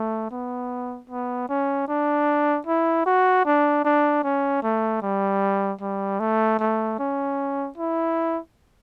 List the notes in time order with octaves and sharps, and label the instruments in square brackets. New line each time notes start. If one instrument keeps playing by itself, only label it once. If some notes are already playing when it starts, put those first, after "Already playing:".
Already playing: [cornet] A3
B3
B3
C#4
D4
E4
F#4
D4
D4
C#4
A3
G3
G3
A3
A3
C#4
E4